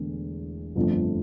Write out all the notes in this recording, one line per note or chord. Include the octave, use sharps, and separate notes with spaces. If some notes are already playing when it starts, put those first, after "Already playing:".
Already playing: E1 E2 D3 A3
G1 F2 D3 F3 A3